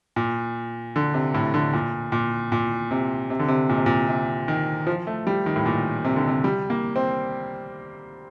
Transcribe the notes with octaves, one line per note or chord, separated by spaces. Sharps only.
A#2
D3
C3
A2
D3
A#2
A#2
A#2
C3
C3
D3
C3
A#2
C3
A#2
C3
D#3
F3
A3
G3
D#3
A2
A#2
C3
D3
C3
G3
A#3
C4